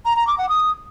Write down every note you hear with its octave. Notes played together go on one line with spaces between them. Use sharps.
A#5
A#5
D6
F#5
D#6